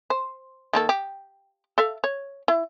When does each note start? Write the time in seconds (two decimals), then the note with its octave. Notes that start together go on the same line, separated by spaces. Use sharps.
0.10 C5
0.73 D#3 A#3 A4
0.89 G4
1.78 A4 E5 F5
2.04 C#5
2.48 E4